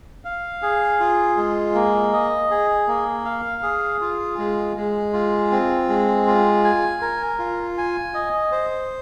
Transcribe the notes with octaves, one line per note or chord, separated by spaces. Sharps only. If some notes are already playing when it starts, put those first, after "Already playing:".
F5
G#4
F4
G#3
A#3
D#5
G#4
A#3
F5
G#4
F4
G#3
G#3
F4
C4
G#3
F4
G#5
A#4
F4
G#5
D#5
C5